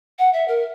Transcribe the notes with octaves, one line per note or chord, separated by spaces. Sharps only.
F#5
E5
A#4